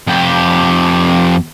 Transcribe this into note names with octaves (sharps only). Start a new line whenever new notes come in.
F2 G4